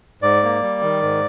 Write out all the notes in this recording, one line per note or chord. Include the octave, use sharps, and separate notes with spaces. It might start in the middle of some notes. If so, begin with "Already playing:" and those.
G#2 D5
A#3
G3
D#3
G#2